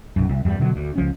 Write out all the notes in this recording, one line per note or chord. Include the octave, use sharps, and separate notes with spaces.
B1 F#2
C2
E2 G2 G3
B2 D3 D#3 F#3
D2
C#2 F3 C#4